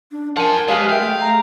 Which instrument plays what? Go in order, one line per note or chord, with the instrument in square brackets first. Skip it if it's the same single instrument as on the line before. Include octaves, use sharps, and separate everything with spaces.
[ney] D4
[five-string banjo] F3 [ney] A#4 [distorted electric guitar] F#5 G#5
[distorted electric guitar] F#3 B4 [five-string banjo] G#3 [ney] G4 [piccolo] F5
[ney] E5 [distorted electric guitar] F5 [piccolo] G5
[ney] A3
[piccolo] A#5